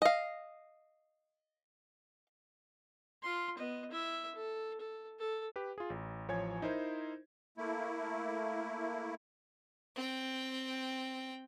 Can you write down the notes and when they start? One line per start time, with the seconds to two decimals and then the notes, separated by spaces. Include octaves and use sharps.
0.02 D#5 F5
3.22 F4 C6
3.57 B3 D#5
3.91 E4 E5
4.35 A4
4.81 A4
5.19 A4
5.56 G4 B4
5.78 F4 G#4
5.90 A1
6.28 A1 F3 C#5 G#5 G#6
6.62 D#4 E4 A#4 C5
7.58 A3 A#3 E4
9.96 C4 G5